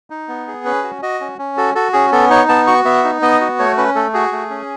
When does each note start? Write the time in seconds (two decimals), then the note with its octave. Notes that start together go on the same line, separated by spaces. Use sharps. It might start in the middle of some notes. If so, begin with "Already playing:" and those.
0.10 D#4
0.28 B3
0.48 G#4
0.65 C#4 B4
0.84 F#4
1.02 F#4 D#5
1.21 C#4
1.39 C#4
1.57 F#4 A4
1.75 F#4 A4
1.93 C#4 G#4
2.12 B3 A4
2.30 D#4 C#5
2.49 B3 A5
2.67 F#4 C#6
2.85 B3 E5
3.04 D#4
3.22 B3 D#5
3.41 F#4
3.59 A3 C#5
3.77 C#4 B4
3.95 A3 A4
4.14 F#4 G#4
4.32 A3
4.50 C#4